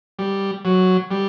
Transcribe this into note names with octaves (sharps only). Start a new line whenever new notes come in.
G3
F#3
G3